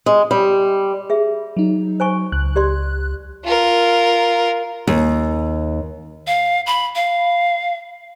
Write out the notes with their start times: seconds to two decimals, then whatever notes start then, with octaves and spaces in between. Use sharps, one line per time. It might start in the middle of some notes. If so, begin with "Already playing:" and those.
0.06 G#3
0.31 G3
1.10 G#4 E5
1.57 F#3 D#4
2.00 C5 G#5 C#6
2.32 C#2 F#6
2.56 G4 D5 C6
3.44 F4 A#4
4.87 D#2
6.27 F5
6.66 B5
6.95 F5